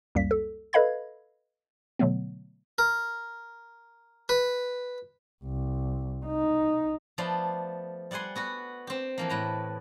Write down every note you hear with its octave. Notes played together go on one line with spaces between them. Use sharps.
C#2 F#2 G3 A#3 B6
A4
A4 B4 D#5 F5 B5 G#6
B2 D3 F#3 A3 B3
A#4
B4
C2
D#4
F3 A3 B3 D5 C6
G3 D5 F#5 G#5 C6
B3 F#4 B4
C4 G4
E3 F3 A#3
A2 B4 A#5